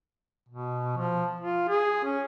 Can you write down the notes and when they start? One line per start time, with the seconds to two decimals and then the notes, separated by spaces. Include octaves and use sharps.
0.49 B2
0.97 F3
1.41 F4
1.69 G#4
2.04 C#4